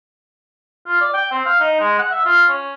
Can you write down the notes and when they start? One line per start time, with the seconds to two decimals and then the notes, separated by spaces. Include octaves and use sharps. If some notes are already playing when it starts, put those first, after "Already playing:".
0.87 F4
1.01 D5
1.14 G5
1.32 C4
1.46 F5
1.60 D#4
1.80 G#3
1.99 F#5
2.12 E5
2.25 F4
2.49 C#4